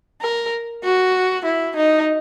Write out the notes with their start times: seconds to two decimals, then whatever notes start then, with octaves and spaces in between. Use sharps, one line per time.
0.22 A#4
0.84 F#4
1.45 E4
1.76 D#4